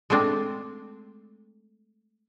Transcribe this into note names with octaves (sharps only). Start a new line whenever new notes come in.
G#3 A3 C4 D4